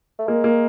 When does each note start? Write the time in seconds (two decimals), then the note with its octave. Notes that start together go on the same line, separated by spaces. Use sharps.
0.19 A3
0.27 G#3 A#3
0.44 A#3